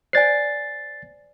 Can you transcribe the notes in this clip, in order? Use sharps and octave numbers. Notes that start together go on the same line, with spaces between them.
C5 D5 G#5 A6 C7